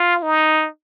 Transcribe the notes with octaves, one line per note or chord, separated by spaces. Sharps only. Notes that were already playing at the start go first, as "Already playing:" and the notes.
Already playing: F4
D#4